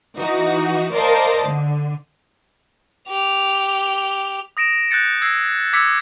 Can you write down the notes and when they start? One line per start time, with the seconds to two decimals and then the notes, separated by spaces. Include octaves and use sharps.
0.16 E3 D#4 F#4
0.94 A#4 C5 D5 D#5 F5 A5
1.47 D3
3.09 G4 F7
4.57 D#6 A#6 D7 E7
4.91 F#6 G6 A6 C#7
5.22 E6 G#6 A#6 C7
5.73 D6 E6 G#6 A6 B6 C#7